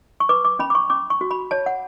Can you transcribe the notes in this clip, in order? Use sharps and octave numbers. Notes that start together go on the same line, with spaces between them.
C#6
B4 D6
D6
C#4 B5
D6
C#6
C#4 D6
C#6
F#4
B5
C#5 A5
F#5